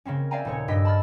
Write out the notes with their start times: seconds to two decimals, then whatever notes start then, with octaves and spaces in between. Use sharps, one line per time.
0.05 C#3 A#3 C4 C#4
0.31 D5 E5 F5 G5 G#5 A#5
0.45 D#1 A4 C#5
0.68 G2 G4 D#5 E6 B6
0.85 A5 B5 E6 F6 A6